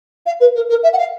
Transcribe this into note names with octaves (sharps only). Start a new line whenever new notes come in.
F5
B4
A#4
A#4
E5
F#5
F5